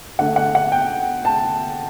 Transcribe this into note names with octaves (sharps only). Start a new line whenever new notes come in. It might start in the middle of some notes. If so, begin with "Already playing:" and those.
D3 A3 D4 F#5
F#5
F#5
G5
A5